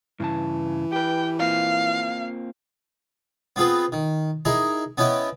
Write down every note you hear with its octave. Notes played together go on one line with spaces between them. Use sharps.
G2 C#3 E3 A5
G4 B4 G5
A#3 C4 F4 F5
B3 C4 F4 G#4 B4
D#3
D#4 E4 G#4 A#4
B3 C#4 E4 D#5 G5